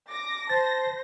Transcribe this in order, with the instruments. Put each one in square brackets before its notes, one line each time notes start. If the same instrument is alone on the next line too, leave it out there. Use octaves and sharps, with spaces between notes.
[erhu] D6 [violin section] A#6
[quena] C5 [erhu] A5 [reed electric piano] A6